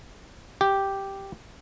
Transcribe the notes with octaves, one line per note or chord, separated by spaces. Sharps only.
G4